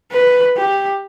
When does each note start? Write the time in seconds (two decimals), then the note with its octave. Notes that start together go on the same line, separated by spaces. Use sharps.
0.12 B4
0.57 G4